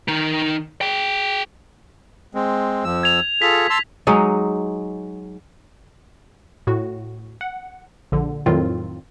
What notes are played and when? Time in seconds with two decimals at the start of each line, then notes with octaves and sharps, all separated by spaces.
0.08 D#3 D#4
0.81 G#4 G5
2.35 G#3 C4
2.84 F2 F3 E6
3.03 G#6 F7
3.42 F4 G#4 A4 B6
3.70 A5 C6 E6
4.07 F#3 G#3 D#4
6.67 A2 F#4
7.41 F#5
8.12 A#1 D3
8.46 F2 A2 D#3 F#3 C4 F4